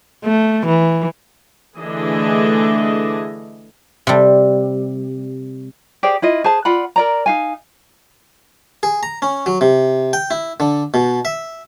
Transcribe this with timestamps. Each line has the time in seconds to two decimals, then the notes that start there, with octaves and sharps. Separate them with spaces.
0.25 A3
0.66 E3
1.79 D3 E3 A3 D4 G#4 D#5
4.07 C3 G3
6.03 G4 G#4 C5 D5
6.22 E4 F4 D#5
6.44 G#4 C5 A5
6.65 F4 D5 F#5 B5
6.96 A#4 D5 A#5
7.26 D#4 F5 G#5
8.83 G#4
9.03 A#5
9.22 C#4
9.46 F#3
9.61 C3
10.13 G5
10.31 E4
10.60 D3
10.94 B2
11.25 E5